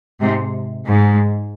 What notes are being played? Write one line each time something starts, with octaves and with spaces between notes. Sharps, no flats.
G#2 C3
G#2